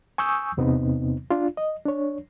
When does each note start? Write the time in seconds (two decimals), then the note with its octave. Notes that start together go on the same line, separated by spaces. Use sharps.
0.18 G#5 C#6 D#6 E6 G6
0.57 E2 C3 B3 C4 D#4
1.30 D4 F4
1.57 D#5
1.86 D4 C#5